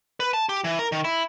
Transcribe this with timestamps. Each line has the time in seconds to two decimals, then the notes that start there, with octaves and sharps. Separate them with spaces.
0.20 B4
0.34 A5
0.49 G4
0.64 E3
0.79 A#4
0.92 D#3
1.04 E4